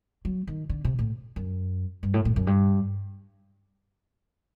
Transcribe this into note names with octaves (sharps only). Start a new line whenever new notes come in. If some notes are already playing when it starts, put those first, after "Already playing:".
F#3
D#3
D3
C3
A2
F#2
G2
A2
A2
F#2
G2